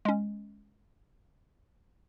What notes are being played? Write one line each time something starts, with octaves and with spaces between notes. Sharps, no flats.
G#3 C#4